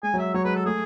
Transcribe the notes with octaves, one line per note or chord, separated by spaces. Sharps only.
G#3 G#5
F#3
E5
F#3 C#5
G#3 B4
A4
A3 G#4